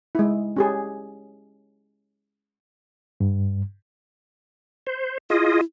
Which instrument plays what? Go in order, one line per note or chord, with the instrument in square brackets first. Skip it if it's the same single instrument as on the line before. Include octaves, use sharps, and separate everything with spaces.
[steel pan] G#3 E4
C#4 G4 G#4
[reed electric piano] G2
[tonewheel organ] C5
[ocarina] E4 [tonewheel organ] F4 G#4 D#5